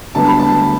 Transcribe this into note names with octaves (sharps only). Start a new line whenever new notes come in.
E1 D2 D3 G3 B3 A5
B5
A5